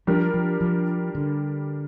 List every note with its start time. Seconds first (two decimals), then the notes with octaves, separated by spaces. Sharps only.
0.07 F3 G3 D4 G4 A#4
0.34 F3
0.61 F3
1.15 D3